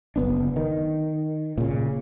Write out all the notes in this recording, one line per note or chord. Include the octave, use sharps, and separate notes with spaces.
F#1 B3 D4
D#3
A#2 C#3